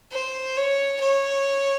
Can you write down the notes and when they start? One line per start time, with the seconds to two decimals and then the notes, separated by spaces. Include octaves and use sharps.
0.12 C5
0.57 C#5
1.01 C#5